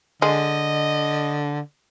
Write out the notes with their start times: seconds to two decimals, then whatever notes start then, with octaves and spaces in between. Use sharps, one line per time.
0.22 D3 G#3 D#5